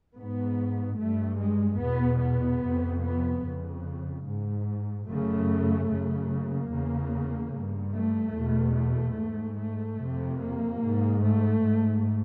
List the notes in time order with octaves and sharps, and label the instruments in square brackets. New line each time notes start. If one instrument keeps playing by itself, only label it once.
[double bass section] G#2 B3
G2 A3
G#3
E2 B2 B3
B3
F2 C3
B3
F2 C#3
G#2
F#2 C#3 A3
F#2 C#3
A#3
E2 C#3
G2
A3
E2 B2
A3
G#2
A3
F2 C3
A#3
G#2
A3
G#2